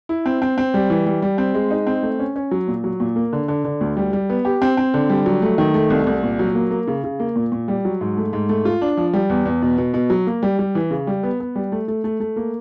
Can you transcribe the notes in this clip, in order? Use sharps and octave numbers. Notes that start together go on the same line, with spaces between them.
E4
C4
C4
C4
G3
E3
G3
G3
C4
G#3
D#4
C4
A3
C#4
C#4
F#3
A#2
F#3
A#2
A#3
D3
D3
D3
D2
G3
G3
B3
G4
C4
C4
D3
G3
F#3
A3
D#3
A3
C2
C2
A#2
F#3
A#3
A#3
C#3
C#3
A#3
A#2
A#2
G3
F#3
G#2
A3
G#2
A3
F4
D4
F3
G3
E2
E2
B2
B2
B2
F#3
A#3
G3
G3
E3
C#3
G3
B3
B3
G3
A3
A3
A3
A3
A#3